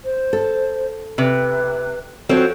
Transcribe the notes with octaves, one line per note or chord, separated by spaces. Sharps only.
C5
A4
C3 B4
F3 C4 F#4 A4 C#5